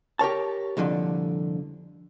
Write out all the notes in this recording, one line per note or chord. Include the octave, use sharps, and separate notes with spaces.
G4 A#4 C#5 A5
C2 F2 A#2 D3 F3